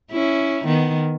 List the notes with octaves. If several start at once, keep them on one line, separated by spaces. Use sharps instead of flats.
C#4 E4
D#3 B3